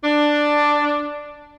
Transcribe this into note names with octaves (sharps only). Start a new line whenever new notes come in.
D4